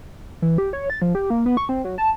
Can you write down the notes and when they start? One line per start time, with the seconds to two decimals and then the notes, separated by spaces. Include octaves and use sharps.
0.42 E3
0.58 G4
0.73 C#5
0.90 A6
1.02 F3
1.15 G4
1.30 A#3
1.46 B3
1.57 C#6
1.69 C4
1.84 F#3
1.98 A5